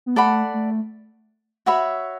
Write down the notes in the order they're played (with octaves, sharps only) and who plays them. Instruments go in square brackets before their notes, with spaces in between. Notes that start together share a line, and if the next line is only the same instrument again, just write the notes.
[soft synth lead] B3
[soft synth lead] A3 [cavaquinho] A4 D5 F#5 B5
[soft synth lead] A3
[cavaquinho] F#4 C#5 E5 B5